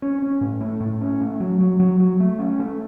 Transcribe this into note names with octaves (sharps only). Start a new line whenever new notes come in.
C#4
C#4
A2
A3
A2
C#4
A3
F#3
F#3
F#3
F#3
A3
C#4
A3